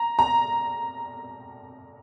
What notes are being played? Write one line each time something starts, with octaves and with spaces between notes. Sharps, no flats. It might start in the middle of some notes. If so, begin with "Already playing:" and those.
Already playing: A#5
A#5